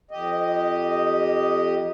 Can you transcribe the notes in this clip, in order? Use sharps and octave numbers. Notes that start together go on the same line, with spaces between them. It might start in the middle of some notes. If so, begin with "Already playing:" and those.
F2 G4 D#5